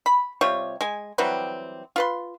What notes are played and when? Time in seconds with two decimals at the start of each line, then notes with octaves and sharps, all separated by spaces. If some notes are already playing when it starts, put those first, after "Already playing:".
0.06 B5
0.41 C3 G3 F4 C#5
0.81 G#3 G#5
1.18 E3 F#3 G3 C4
1.96 F4 B4 C6